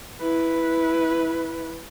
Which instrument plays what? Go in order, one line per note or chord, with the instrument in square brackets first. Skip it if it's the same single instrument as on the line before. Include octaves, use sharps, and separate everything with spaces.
[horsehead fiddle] E4 B4